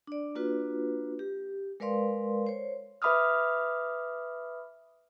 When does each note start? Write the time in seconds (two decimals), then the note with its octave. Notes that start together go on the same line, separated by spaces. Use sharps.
0.07 D4 D5
0.35 A#3 D4 F4 F#4 B4
1.19 G4
1.80 G#3 A#4 B4 D5 F5 C6
2.46 C5 C#5
3.02 B4 E5 B5 D6 D#6 F6